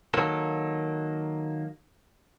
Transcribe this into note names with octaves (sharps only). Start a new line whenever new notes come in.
D#3 F#3 A#3 A4